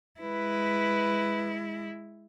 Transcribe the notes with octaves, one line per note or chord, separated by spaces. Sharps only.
G#3 E4 B4